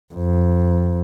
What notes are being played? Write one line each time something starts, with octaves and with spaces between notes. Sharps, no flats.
F2